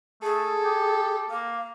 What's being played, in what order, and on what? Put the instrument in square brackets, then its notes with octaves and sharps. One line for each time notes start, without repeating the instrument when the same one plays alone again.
[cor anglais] A3 [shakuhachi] G#4 [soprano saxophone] A4
[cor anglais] G4
[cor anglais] A#3 [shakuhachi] F5